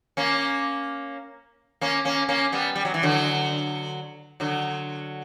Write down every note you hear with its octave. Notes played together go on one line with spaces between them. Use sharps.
A#3 C#4
A#3 C#4
A#3 C#4
A#3 C#4
G3 B3
G3
F#3
E3
D3 F#3
D3 F#3